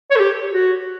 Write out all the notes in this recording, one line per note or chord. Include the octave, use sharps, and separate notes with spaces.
C#5
A4
G4
F#4